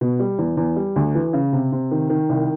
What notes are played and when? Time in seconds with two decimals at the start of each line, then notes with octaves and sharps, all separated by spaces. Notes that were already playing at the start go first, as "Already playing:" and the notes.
0.01 B2
0.19 G3
0.38 E2
0.57 E2
0.76 G3
0.96 D2
1.15 E3
1.33 C#3
1.53 C3
1.72 C3
1.91 D#3
2.10 D#3
2.29 C2